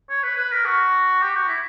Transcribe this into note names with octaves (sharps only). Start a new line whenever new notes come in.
C#5
B4
B4
A#4
F#4
G4
F#4
E4